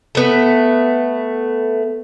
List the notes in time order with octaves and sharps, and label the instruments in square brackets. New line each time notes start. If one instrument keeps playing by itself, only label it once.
[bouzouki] A3 B3